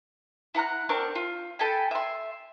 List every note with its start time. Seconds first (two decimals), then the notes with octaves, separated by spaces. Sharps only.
0.55 E4 F#5 A#5 F#6
0.89 C4 D4 A#4 C#6
1.15 F4
1.59 A4 G5 G#5 B5
1.91 E5 C6